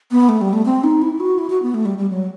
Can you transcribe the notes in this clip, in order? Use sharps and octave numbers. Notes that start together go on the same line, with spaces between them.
B3
A3
G3
A3
C4
D#4
E4
F#4
E4
F#4
B3
A3
G3
G3
F#3